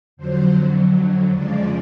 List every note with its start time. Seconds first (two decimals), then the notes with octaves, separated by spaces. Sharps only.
0.17 F2 D3 F#3 C5
1.31 F2 C#3 F3 G#3 D5